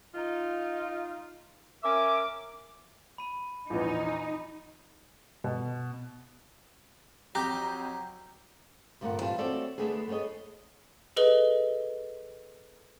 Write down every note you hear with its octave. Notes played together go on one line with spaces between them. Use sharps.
D#4 F4
C#4 A#4 E5 D6
B5 D#7
A#1 E2 D#4
B2
F2 F#3 G4 A#5 G6
D2 G2 A#2 A3 A#4 F#5
E3 G3 F4 A5
A3 C4 F#4 A4 C#5 D5
D2 E3 A3 B3 D4 G#4
A3 B3 G#4 C#5 D#5
G#4 A4 B4 D#5 G7